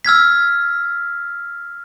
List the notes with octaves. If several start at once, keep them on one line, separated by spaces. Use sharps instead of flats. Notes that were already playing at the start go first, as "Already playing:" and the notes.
E6 F6 G#6 B6